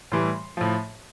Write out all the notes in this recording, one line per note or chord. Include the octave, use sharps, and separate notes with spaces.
A2 E3 G3 C6
A2 F3